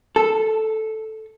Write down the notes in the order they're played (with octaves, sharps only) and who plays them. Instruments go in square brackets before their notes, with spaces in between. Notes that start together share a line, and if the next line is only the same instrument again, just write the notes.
[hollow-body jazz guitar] A4